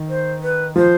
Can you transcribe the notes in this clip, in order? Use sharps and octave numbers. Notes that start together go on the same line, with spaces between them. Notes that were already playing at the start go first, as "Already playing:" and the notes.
Already playing: D#3
C5
B4
F3 C5